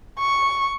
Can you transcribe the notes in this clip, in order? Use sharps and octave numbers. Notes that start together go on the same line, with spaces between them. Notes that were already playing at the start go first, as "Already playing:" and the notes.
C#6